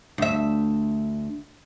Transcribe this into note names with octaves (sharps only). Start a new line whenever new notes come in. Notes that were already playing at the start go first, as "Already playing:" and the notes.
D2 E5